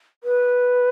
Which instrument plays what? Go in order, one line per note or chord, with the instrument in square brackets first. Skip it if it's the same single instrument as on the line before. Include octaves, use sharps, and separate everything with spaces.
[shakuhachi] B4